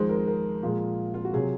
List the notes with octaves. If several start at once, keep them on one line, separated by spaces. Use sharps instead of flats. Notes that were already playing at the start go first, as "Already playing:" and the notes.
Already playing: F2 D#3 G#3 C5
A#4
A#4
A#2 F3 G#3
F4
F#4
C3 F#3 G#4